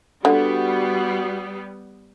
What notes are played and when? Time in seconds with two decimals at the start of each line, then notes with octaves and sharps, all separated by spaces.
0.25 D3 G3 B3 F#4